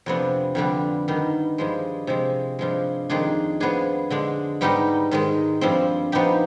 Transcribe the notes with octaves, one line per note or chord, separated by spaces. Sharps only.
F2 C3 F3 B3 D4
F2 D3 G3 B3 D4
G2 D#3 B3
G2 F3 G#3
C3 F3 G#3
G2 F3 G#3
F2 D#3 G#3 D4 G#4
F3 B3 D4 G#4
D3 G#3 D4
G#2 G3 B3 D#4 G4
G#2 D#3 G#3
G2 F3 C4
F3 B3 D#4 G4